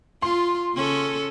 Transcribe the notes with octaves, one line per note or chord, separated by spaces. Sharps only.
F4 C6
C#3 C#4 A4